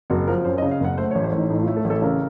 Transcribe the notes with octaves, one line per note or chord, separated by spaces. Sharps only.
F#1 F#4
F3 A#4
F#2 C5
D#5
C#3
F5
F#1 F#5
A3 C5
C#5
A1
C5
A1
D#4
A2 D#4
F4
A3
A4
A1
A4
C#3 A#4